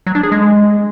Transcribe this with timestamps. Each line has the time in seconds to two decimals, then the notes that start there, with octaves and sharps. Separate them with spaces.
0.07 F#3
0.15 D4
0.23 G#4
0.32 G#3